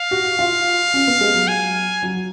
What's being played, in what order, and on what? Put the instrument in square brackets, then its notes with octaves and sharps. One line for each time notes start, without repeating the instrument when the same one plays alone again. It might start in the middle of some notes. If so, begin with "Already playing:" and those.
Already playing: [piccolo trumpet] F5
[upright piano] F#4
F4
C#4
B3
G#3
F#3
[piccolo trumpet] G#5
[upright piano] F#3